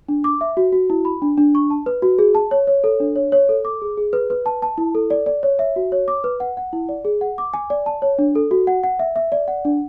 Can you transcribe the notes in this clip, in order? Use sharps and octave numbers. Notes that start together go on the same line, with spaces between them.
D4
D6
E5
F#4
F#4
E4
B5
D4
D4
C#6
A5
B4
F#4
G#4
A5
C#5
C#5
A4
D4
C#5
C#5
A4
D6
G#4
G#4
B4
B4
A5
A5
E4
A4
D5
D5
C#5
E5
F#4
C#5
D6
B4
F#5
F#5
E4
D5
G#4
F#5
D6
G#5
D5
A5
C#5
D4
A4
F#4
F#5
F#5
E5
E5
D5
F#5
D4